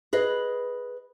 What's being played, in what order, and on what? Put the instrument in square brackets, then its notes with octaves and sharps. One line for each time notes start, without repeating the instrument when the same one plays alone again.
[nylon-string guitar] G#4 B4 D#5